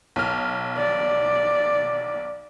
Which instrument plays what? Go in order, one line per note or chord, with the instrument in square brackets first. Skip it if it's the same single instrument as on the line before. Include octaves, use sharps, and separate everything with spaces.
[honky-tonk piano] B1 F6
[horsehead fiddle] D5